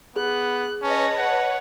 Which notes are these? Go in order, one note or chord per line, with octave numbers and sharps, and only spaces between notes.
B3 G#4 F#6
C#4 B4 C#5 D#5 A5
F#5